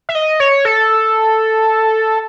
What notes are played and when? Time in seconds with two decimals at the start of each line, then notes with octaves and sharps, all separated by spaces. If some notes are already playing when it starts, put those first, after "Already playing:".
0.09 E5
0.15 D#5
0.40 C#5
0.65 A4